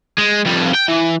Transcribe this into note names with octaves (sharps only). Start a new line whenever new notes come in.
G#3
F2 G3
G5
E3